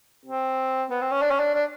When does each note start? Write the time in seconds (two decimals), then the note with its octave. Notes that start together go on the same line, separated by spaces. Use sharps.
0.25 C4
0.90 B3
1.01 C4
1.11 C#4
1.22 D4
1.31 C#4
1.39 D4
1.54 D4